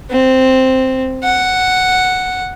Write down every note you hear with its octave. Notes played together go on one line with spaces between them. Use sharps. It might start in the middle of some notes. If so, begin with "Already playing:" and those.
C4
F#5